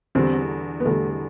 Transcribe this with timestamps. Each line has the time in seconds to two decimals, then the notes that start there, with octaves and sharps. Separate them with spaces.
0.15 E2 D3 G3 C4
0.80 B3
0.85 E2 D3 G3 A3